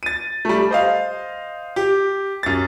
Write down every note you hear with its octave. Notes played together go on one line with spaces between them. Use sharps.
A6 D#7
G3 A3
C5 D#5 F5
G4
F#2 A6